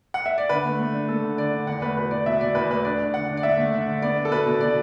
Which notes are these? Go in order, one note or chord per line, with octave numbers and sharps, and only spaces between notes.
F#5
E5
D5
D3 B4
A3
A3
D4
A3 A4
D3
D3 D5
D3
E2 F#5
A3 B4
B2 B4
B2 D5
B2 E5
B2 D5
E2 B4
A3 B4
D4 D5
D4
D3 F#5
D4
D5
D3 E5
A3
D3
D3
B3 D5
D4
A4
B2 B4
B2
B2 D5